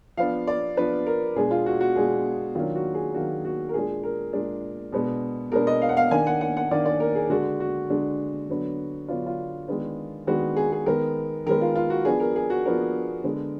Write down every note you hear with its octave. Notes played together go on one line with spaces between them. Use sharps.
F3 B3 D4 F5
D5
F3 B3 D4 B4
A#4
B2 G#3 D4 G#4
F4
F#4
F#4
B2 G#3 D4 G#4
D#3 F#3 A#3 D4 F4
F#4
G#4
D#3 F#3 A#3 D4 F#4
F#4
A#4
A#2 G#3 D4 G#4
A#4
A#2 G#3 D4
B2 G#3 B3 D4
B2 G#3 B3 D4 A#4
D#5
F5
F#5
F5
D#3 A#3 D4 G#5
F#5
F#5
F#5
D#3 A#3 D4 D5
D5
A#4
G#4
D3 G#3 D4 F#4
F#4
D3 G#3 D4
D3 F#3 B3 D4
D3 F#3 B3 D4 F4
F4
D#3 G#3 B3 D4
D#3 G#3 B3 D4 F#4
G#4
G#4
D#3 G#3 B3 A#4
D#3 G#3 B3 A#4
F4
F4
F#4
F3 B3 D4 G#4
A#4
G#4
F#4
F3 B3 D4 A#4
D3 G#3 B3 D4